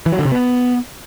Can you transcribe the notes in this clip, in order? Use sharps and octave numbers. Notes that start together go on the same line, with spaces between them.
E3
F#3
D3
C3
B3